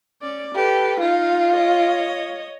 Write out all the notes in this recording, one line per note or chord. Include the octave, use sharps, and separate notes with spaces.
C#4 D5
G4 A4 B4
D#4 F4 F5
C#5 D#5